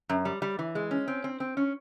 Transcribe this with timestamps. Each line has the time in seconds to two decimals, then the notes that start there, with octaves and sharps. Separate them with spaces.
0.09 F#2
0.25 G3
0.42 G3
0.59 E3
0.75 G#3
0.91 C#4
1.08 C4
1.24 C4
1.40 C4
1.57 C#4